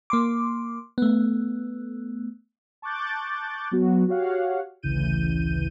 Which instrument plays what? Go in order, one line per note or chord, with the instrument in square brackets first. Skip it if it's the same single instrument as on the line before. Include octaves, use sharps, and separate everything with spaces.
[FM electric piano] A#3 C6 D6
A3 B3
[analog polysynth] A5 C#6 D6 F#6 G6 A6
F#3 B3 F#4
F#4 G4 C#5 F5 F#5
A1 D2 C#3 E3 G6 D#7